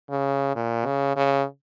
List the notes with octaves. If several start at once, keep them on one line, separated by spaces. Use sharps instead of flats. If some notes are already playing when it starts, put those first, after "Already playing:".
C#3
A#2
C#3
C#3